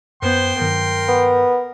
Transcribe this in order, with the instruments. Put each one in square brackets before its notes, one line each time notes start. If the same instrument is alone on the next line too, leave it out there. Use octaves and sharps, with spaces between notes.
[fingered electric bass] F#2 [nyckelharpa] B3 C5 [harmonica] G5 C6
[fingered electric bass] G2 D#3 F#3 [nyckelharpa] A#4
[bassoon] B3